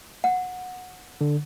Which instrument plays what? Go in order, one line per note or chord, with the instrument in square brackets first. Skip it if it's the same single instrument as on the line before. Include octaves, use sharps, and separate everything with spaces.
[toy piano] F#5
[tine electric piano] D3